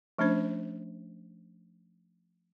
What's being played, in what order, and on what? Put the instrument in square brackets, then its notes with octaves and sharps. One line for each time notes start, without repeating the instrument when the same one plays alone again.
[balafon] F3 A3 C#4 D4 C5